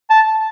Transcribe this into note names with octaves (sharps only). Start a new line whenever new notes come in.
A5